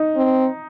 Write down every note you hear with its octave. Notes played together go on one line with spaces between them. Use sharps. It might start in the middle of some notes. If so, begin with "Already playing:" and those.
Already playing: D#4
C4